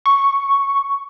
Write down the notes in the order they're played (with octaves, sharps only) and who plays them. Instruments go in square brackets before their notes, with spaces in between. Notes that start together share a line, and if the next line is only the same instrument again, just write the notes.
[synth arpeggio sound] C#6